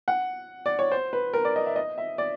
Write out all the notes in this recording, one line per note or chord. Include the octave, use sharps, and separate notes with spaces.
F#5
D5
C#5
C5
B4
A#4
D5
D#5
E5
D#5
E5
D5